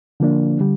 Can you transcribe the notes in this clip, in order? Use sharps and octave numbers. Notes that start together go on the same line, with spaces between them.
D3 F3 A#3 D4
D3 G3